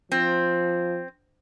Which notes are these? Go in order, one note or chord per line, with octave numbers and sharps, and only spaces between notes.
F3 C4